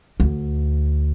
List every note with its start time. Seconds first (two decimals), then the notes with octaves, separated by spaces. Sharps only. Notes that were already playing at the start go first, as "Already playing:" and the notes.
0.20 D2